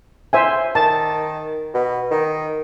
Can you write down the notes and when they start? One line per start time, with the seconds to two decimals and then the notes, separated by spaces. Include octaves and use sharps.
0.33 C5 E5 G#5
0.75 D#3 A5
1.74 B2
2.11 D#3